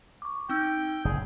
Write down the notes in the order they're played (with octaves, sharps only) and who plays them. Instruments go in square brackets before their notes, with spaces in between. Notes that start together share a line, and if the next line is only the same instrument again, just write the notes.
[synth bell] C#6 D6
[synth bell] C4 D#4 E6 [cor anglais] G5
[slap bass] F#1 [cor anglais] G#4